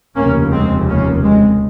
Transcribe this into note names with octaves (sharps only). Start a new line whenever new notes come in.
F1 D#2 C#3 A#3 C#4
G#3 C4
A#3 C#4
G#3 C4